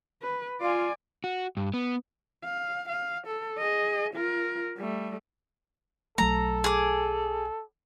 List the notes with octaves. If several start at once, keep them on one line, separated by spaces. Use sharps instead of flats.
B4
F4 D5 G#5
F#4
G2
B3
F5
F5
A4
G#4 D#5
F4 A#4
G3 A3
B1 F#3 A3 A4 A#5
G#4 D6